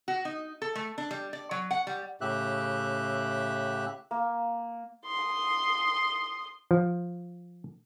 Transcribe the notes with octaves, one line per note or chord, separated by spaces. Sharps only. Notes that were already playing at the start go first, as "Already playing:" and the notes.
F#4
D#4
A4
A3
D4
G3
D5
F#3
F#5
G3
A2 C#3 G4 E5 F#6
A#3
C6 D#6
F3